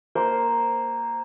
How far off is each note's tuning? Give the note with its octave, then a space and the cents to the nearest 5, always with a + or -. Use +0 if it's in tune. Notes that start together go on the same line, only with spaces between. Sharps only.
A#3 +0 C5 +0